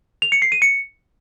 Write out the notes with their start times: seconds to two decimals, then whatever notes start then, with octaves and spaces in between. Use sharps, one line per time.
0.22 F7
0.32 C#7
0.42 C7
0.52 D#7
0.62 C#7